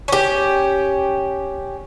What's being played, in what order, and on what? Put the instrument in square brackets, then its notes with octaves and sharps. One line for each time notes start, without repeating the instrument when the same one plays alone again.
[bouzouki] C#4 G4